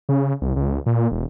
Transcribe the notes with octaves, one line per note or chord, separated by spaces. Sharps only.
C#3
C2
C#2
A#2
E1